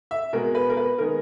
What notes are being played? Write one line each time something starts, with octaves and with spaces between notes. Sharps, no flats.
E5
B2 G#3 B3 A#4
B4
A#4
B4
D#3 G#3 B3 A#4